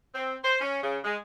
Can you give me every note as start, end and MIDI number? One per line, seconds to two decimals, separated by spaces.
0.15 0.35 60
0.44 0.57 72
0.61 0.80 61
0.83 0.99 49
1.04 1.16 56